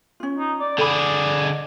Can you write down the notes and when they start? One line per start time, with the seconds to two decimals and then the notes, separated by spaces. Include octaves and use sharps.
0.20 C#4 F4
0.38 D#4
0.60 D5
0.78 D3 G#4 A4 F#5 B5
1.43 D#5